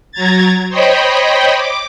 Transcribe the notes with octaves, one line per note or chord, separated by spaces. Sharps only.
F#3 A#5 G#6 A6
C5 C#5 D#5 G5 B5
D6